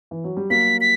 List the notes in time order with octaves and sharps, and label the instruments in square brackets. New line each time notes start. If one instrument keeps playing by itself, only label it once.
[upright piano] E3
F#3
G3
[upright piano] F#3 A#3 [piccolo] B6
[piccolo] B6